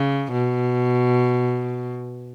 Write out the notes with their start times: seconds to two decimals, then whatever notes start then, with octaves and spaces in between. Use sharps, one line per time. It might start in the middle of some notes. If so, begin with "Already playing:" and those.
Already playing: C#3
0.32 B2